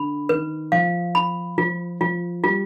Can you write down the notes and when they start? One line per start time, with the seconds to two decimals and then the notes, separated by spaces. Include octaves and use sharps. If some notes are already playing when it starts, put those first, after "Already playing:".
Already playing: D3 B5
0.29 D#3 B4
0.72 F3 F5
1.15 B5
1.58 F3 F4
2.01 F3 F4
2.44 G3 F4